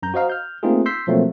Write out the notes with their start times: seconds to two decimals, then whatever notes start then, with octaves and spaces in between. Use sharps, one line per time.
0.03 F#2 A#5 G6
0.14 F#4 C5 D#5 F5 A#5
0.30 F6 G6
0.63 A3 A#3 C4 D#4 F4 G#4
0.86 C6 E6 G6 B6 C7
1.07 B2 F3 F#3 A3 A#3 C4